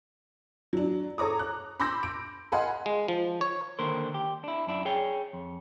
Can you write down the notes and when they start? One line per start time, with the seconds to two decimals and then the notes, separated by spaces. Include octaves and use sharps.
0.73 F#3 D4
1.18 A4 C#5 A#5 D6 D#6
1.39 F#6
1.80 B5 C6 D6 E6 G6 A#6
2.03 D7
2.52 D#5 F5 F#5 G#5 B5 C6
2.86 G#3
3.08 F3
3.41 C#5
3.79 D3 D#3 A#3 A#4 C5
4.14 G4
4.44 D4 E4
4.67 F#2 D4 E4
4.85 G#4 C#5 G5
5.33 F2